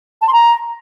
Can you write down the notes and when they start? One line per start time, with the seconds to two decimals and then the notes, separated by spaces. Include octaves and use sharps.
0.21 A5
0.27 C6
0.33 A#5